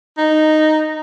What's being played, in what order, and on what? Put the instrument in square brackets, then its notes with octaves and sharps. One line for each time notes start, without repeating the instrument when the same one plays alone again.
[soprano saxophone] D#4